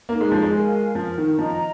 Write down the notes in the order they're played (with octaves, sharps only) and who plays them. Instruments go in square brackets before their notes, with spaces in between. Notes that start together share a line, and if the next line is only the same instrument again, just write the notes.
[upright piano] A#3 [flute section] D#4
[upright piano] G#3
F3
G#3
[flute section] A#4 F5 G#5
[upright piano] F3 [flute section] A#4
[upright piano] D#3
[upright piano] F3 [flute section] D#5 A#5